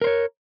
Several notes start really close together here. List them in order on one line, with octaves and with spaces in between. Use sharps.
A#4 C5 C#5